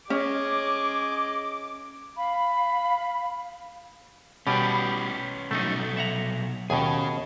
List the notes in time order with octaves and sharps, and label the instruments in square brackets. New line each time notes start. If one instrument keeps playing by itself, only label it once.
[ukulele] C#4 [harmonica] G#4 D#5 [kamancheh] D6
[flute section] F5 B5
[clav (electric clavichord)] B2 G3 G4 [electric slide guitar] C#4 B4
[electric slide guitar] B2 F#3 A4 [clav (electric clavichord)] A3 D#4
[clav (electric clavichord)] E5 F#5 A#5
[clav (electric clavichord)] D#2 B2 [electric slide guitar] C#4 G#4